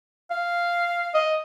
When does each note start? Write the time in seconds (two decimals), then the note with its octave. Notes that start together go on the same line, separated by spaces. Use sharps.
0.31 F5
1.14 D#5